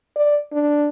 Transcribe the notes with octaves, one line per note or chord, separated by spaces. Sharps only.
D5
D4